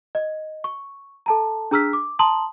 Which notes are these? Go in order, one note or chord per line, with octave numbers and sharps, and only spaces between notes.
D#5
C#6
A4 A5 A#5
D4 G#4 A#5 E6 F6 B6
D6
A5 A#5 C6 D#6 F#7